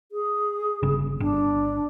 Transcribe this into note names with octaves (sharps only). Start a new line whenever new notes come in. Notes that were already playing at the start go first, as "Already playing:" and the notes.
G#4
G1 C#3
G1 D4